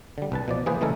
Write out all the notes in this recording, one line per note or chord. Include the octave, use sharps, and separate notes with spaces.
D3 G3
C2 B4 A5
B2 F3 D5
E3 A#3 G#4 B4 C5
C#3 E3 G#3 A3 A4 A#4